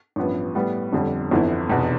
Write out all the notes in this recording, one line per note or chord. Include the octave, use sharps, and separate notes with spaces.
A1 G2 F3 B3
A2 G3 B3
G1 F2 D3 G3
G1 F2 E3 B3 E4
F1 E2 B2